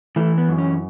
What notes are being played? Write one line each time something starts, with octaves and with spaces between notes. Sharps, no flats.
E3 A3
B3
F#2
C#4